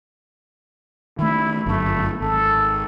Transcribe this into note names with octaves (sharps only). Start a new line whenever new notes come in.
D#3 A3 E4
G1 F#2 A3
G#1 A4